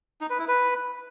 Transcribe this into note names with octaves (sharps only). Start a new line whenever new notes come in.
D#4
B4
E4
B4